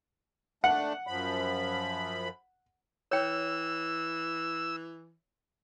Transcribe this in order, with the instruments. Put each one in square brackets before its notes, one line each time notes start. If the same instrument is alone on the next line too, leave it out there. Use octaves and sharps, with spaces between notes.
[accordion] A3 D4 [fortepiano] F#5
[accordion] F#2 F3 B5
[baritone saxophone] E3 [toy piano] C#5 G5 [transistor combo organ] E6